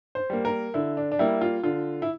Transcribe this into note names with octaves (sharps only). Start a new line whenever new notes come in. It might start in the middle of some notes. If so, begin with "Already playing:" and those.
C5
G3 A#3
A#4
D3 E4
D4
D4
G3 A#3 E4
F4
D3 F4
E4